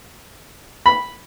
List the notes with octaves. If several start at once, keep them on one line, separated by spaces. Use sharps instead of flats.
B5